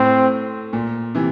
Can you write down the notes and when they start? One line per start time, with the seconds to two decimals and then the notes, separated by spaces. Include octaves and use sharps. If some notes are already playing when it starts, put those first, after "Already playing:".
Already playing: A2 C4
0.73 A#2
1.15 C3 E3